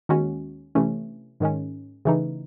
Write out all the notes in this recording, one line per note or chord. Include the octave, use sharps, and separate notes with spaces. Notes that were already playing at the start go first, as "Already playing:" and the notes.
D#2 D#3 G#3 C#4 F#4
C3 E3 A3 C#4
G#2 D#3 G#3 C#4
C#3 E3 A3 D#4